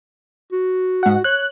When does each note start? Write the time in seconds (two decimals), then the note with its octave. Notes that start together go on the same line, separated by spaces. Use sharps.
0.52 F#4
1.03 G#2 F#5
1.24 C#5 F#6